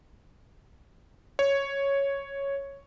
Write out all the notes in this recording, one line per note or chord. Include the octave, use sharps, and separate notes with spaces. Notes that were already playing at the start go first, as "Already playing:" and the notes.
C#5